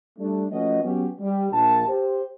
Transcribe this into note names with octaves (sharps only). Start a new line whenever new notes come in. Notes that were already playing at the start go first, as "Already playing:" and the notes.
G3 A3 D4
F3 A3 C#4 F#4 B4 D#5
F#3 B3 C#4 F#4 G4
G3
A#1 A#2 A5
G4 C5